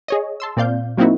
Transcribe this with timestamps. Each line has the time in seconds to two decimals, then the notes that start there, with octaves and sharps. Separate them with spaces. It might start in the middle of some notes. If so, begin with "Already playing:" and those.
0.08 G#4 C#5 D#5
0.40 A5 C6 E6
0.57 A#2 C4 D5 F5 G6
0.97 F#3 A#3 C4 D#4 E4 F#4